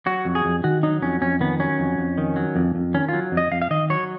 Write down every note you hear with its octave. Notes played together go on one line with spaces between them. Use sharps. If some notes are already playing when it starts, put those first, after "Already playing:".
F#3 F#4
F2
G#4
F2
D#3 F#4
F#3 D#4
F2 C#4
F2 C#4
D#3 B3
F#3 C#4
F2
F2
D#3
F#3
F2
F2
D#3 C#4
F#3 F4
F2
D#5
F2 F5
F5
D#3 D#5
F#3 C#5